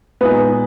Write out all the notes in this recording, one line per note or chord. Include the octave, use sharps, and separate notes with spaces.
A#2 G#3 B3 D#4 B4